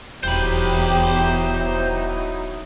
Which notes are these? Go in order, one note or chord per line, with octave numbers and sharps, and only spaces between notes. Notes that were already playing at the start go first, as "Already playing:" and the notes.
D#1 E2 F#3 D#4 E4 G4 C5 B5